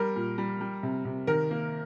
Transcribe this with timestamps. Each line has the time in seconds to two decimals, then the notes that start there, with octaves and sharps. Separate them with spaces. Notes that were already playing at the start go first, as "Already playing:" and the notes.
Already playing: G3 A#4
0.16 A#2
0.38 G3
0.61 G3
0.83 C3
1.05 C3
1.27 D#3 A#4
1.51 A#3